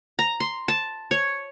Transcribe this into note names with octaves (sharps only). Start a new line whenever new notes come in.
A#5
C6
A5
C#5